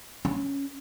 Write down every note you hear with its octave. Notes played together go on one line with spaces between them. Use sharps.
C#4